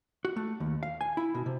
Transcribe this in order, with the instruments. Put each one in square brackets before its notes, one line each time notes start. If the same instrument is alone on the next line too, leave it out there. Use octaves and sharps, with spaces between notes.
[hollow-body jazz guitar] F#4
A3
D#2
F5
G#5
E4
B2
C3